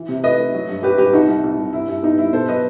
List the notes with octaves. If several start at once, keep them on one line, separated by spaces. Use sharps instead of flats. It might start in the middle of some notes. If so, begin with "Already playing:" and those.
Already playing: E3
C3
A3 B4 D#5
A3
F#3
G2
F#3 G4 B4
G2 G4 B4
C2 D#4 F#4
C2
C2
C2
G2 E4
G2 E4
B3 D#4
G2 E4
B2 A4 C5
F#3 B4 D#5